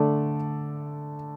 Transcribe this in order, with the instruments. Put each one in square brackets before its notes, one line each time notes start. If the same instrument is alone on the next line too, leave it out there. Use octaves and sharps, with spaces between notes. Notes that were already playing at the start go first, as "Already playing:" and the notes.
Already playing: [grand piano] D3 A3 A4 D5